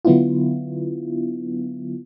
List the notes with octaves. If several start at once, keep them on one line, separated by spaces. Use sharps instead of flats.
D3 F#3 B3 D4 E4 F4